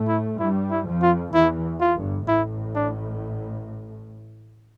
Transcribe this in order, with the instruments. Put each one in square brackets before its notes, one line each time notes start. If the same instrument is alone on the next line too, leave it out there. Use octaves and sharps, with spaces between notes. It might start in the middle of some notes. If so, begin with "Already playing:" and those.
Already playing: [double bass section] A2 A3
[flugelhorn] E4
[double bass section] G2 G3 [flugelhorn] E4
[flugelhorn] E4
[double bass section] F2 F3
[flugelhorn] F4
[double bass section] E2 E3 [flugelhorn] E4
[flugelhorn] F4
[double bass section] G1 G2
[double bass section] A1 A2 [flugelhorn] E4
[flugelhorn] D4